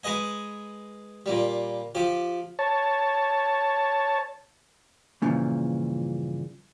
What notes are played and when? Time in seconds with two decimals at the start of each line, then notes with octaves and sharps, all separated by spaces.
0.03 G#3 B4 D#5 G#5
1.26 A#2 G3
1.95 F3 G4
2.59 C#5 A5
5.22 G2 A#2 C#3 E3 F3